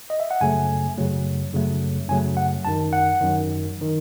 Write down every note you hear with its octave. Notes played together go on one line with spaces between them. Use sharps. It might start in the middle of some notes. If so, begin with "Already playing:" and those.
D#5
E5
F#5
F#2 C#3 F#3 A3 G#5
F#2 C#3 F#3 A3
F#2 C#3 F#3 A3
F#2 C#3 F#3 A3 G#5
F#5
G#1 F#2 D#3 A5
F#5
G#1 F#2 D#3
D#3